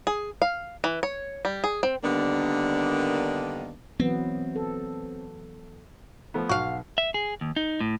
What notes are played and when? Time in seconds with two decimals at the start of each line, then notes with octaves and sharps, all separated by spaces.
0.07 G#4
0.42 F5
0.84 E3
1.03 C#5
1.45 G3
1.64 G#4
1.83 C4
2.04 D3 D#3 G3 A#3 B3 D4
4.00 E3 F#3 B3 C4
4.56 A4
6.34 F3 A3 B3
6.49 B1 F#4 F5
6.98 E5
7.14 G#4
7.41 D#2
7.56 D#4
7.81 A2